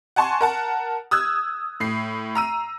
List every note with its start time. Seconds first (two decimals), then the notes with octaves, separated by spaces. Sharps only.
0.16 F#5 G#5 A5 C6 C#6
0.41 A#4 F#5 A5
1.11 D#6 E6 F#6 G#6
1.80 A2 C7
2.35 A#5 E6 D#7